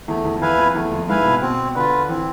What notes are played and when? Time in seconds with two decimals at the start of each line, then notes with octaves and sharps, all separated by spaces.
0.08 E2 A3
0.25 E2
0.36 F2
0.41 E2 E4 B4 F5 G#5
0.58 F2
0.75 E2 A3
0.91 F2
1.08 G#2 E4 B4 F5 G#5
1.25 B2
1.42 B2 C4
1.75 D3 F4 B4
2.09 E3 C4